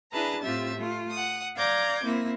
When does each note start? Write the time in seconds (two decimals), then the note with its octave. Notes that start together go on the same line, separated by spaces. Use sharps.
0.12 D4 E4 G#4 B4 A5 A#5
0.41 A2 C4 F4 G4 E5 A6
0.76 A3 F4
1.10 F#5 D#6
1.55 D5 F5 A#5 D6 G6 G#6
2.03 A#3 C4 E4